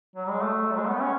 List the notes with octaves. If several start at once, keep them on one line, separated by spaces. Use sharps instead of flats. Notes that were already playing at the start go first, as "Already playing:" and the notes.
F#3
G#3
A3
F#3
G#3
B3
C#4